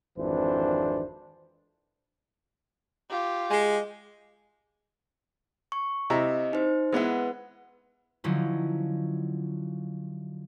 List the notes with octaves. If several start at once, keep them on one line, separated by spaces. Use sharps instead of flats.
G#1 F2 E3 D4 C5
F4 G4
G#3
C#6
C3 E4 D#5 A#5
D#4 C5
G#3 B3 E4 B4 F#5
D3 F3 F#3 C#4 D#4 E4